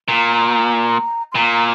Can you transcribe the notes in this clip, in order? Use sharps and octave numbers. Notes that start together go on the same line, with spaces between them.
A#2 A#5
C6
A#2 A#5
A#5